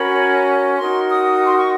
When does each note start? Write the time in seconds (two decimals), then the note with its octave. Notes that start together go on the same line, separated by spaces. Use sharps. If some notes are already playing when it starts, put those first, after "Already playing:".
Already playing: C#4 F#4 A#4 C#5 B5
0.78 D#4 F#4 A#4 C6
1.09 D#6
1.46 C6
1.58 C#6